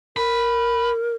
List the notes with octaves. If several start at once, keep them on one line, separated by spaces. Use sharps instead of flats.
A#4 B5